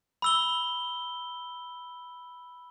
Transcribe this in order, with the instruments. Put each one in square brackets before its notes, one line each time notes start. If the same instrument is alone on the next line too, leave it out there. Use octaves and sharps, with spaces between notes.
[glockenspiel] B5 E6 G7